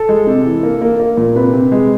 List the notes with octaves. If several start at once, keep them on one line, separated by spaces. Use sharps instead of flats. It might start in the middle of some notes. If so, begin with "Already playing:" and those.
Already playing: A4
G#3
C3
E3
A#3
A#3
A#3
A#2
C3 B4
C3
G#3